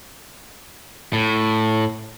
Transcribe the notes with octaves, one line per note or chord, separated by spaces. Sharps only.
A2